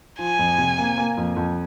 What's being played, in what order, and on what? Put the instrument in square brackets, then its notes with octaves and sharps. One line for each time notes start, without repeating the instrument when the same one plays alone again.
[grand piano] F3 [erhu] G#5
[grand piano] F2
C3
A#3
A#3
F2
F2